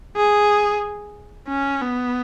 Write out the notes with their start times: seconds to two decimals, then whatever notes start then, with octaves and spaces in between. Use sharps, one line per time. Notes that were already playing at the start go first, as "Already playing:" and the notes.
0.16 G#4
1.49 C#4
1.82 B3